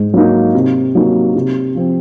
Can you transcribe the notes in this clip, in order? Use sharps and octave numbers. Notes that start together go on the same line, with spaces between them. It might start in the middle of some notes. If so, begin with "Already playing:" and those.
Already playing: G#2
F#3 A#3 D#4
C3
F#3 A#3 D#4
C3
F3 C4